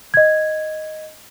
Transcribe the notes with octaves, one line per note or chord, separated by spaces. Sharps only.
D#5 G#6